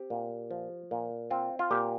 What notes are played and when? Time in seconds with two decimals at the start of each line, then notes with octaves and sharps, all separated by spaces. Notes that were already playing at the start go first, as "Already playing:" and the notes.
Already playing: C4 G4
0.10 A#2
0.51 F3
0.91 A#2
1.31 C4 F4
1.59 F4
1.71 A#2 G4